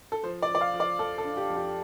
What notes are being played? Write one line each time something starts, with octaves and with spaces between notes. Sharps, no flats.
A4
F3 C5
D5
F3
D5
F5
F3
D5
F2 A4
A4
D4
G4
F2
G4